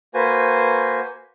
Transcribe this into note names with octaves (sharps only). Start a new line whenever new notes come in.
A#3 F#4 B4 C5 G#5